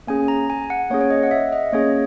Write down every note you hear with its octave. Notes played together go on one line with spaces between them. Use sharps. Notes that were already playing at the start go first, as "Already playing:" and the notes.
A#3 C#4 G#4 G#5
A#5
G#5
F#5
A#3 C#4 G#4 C#5
C#5
D#5
F#5
E5
D#5
A#3 C#4 G#4 C#5